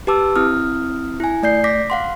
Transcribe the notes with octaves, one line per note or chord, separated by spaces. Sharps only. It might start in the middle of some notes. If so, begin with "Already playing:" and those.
G4 B4 A5 D6 E6
C4 E4 D#6 F6
E4 G#5
A3 D5 G6 C7
D6 A#6 B6
F5 F#5 C6